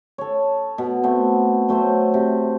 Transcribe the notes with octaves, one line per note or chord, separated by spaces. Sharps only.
A4 C#5
B2
A3 B3 C4
F#3 A3 C4 C5
C3